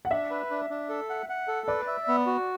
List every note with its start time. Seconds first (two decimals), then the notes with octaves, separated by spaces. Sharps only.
0.05 F#5
0.11 D4 E5
0.30 B4
0.50 D4
0.70 D4
0.89 A4
1.10 F#5
1.29 F#5
1.48 A4
1.67 B4 D5
1.87 E5
2.08 B3
2.26 F#4